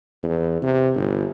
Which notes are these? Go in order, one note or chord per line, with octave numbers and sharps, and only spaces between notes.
E2
C3
G1